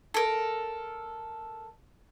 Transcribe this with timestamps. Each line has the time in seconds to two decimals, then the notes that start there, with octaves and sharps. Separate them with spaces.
0.14 A4 A#4